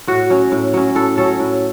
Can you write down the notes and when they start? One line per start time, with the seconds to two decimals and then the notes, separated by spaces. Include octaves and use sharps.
0.07 A2 F#4
0.30 F#3 C#4
0.52 A2
0.74 F#3 C#4
0.95 A2 A4
1.18 F#3 C#4 A4
1.40 A2